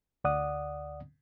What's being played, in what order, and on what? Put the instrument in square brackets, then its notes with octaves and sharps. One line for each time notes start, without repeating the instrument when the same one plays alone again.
[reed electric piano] D2 D5 F#5 D#6